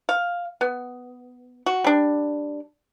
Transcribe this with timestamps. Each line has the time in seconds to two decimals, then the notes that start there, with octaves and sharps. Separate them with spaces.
0.09 F5
0.61 B3
1.66 F#4
1.84 G3 D4